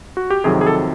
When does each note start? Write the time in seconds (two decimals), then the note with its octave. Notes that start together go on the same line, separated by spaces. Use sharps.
0.17 F#4
0.30 G4
0.44 F2 C3 D#3 F#3 G#4
0.61 G#4
0.67 A4